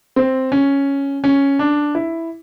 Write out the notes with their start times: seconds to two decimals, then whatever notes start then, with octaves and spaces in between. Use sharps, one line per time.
0.16 C4
0.52 C#4
1.24 C#4
1.59 D4
1.95 E4